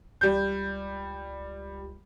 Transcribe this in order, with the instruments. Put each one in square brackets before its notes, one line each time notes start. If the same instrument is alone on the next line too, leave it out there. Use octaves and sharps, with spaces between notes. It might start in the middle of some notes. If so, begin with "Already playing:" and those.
[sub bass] C#2 [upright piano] G3 G6